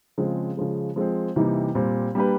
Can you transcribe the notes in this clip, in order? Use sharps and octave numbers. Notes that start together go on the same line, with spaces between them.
C#3 F3 G#3 C4
C#3 F3 G#3
F3 G#3 C4
C3 E3 G3 A#3 D#4
A#2 G3 C4
G3 A#3 D4 G4 B4